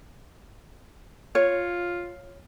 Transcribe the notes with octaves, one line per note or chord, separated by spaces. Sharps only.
F4 C#5